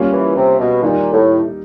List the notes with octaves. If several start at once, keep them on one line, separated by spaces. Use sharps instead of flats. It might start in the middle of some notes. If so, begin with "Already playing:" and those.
Already playing: G3 A#3 C#4 F4
E3
C3
B2
A#2 D#3 G3 A#3 D#4
A2